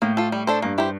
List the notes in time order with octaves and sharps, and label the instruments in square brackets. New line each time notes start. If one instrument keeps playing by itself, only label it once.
[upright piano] A2 [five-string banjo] A#3
[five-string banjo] F4 A4
G3
D4 A4 C5
[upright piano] G2 [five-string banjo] A#3
[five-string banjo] E4 G4 C5